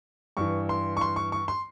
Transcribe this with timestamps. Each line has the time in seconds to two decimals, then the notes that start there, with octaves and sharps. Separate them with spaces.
0.37 G2 E3 C#6
0.69 C6
0.97 C#6
1.01 C6
1.16 C#6
1.32 C#6
1.48 C6